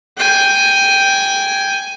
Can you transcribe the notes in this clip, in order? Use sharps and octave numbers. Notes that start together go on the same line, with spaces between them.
G5 G#5